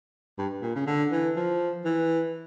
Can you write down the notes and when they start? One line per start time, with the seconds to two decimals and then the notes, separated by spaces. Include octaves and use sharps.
0.39 G2
0.62 A#2
0.75 C#3
0.87 D3
1.12 E3
1.36 F3
1.85 E3